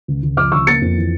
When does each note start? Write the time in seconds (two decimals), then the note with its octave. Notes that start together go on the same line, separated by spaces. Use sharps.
0.08 C#2
0.23 C#2
0.37 F3 D6 F6
0.52 C#2 C#6 E6
0.67 A#3 A6 C#7
0.82 F2
0.97 E3